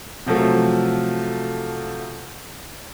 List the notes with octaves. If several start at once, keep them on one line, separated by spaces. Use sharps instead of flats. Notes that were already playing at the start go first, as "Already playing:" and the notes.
C3 F3 F#3 A3